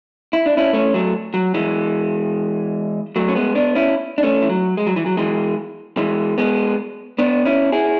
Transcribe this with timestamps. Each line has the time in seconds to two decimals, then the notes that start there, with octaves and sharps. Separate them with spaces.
0.33 E4
0.46 D4
0.57 C#4 E4
0.73 A3 C#4
0.94 F#3 A3
1.34 F#3
1.54 E3 G#3
3.16 F#3 A3
3.29 C#4
3.35 G#3 B3
3.55 B3 D4
3.75 C#4 E4
4.18 D4
4.23 A3 C#4
4.42 E3
4.49 F#3
4.77 G#3
4.87 F#3
4.96 E3
5.06 F#3
5.17 E3 G#3
5.97 E3 G#3
6.38 G#3 B3
7.19 B3 D4
7.45 C#4 E4
7.72 E4 G#4